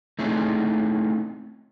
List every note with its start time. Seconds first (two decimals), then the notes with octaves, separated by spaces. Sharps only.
0.19 A3 C4 C#4 D#4 E4 G#4